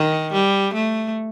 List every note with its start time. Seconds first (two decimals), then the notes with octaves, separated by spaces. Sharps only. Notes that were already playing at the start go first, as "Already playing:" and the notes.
Already playing: D#3
0.32 G3
0.74 A3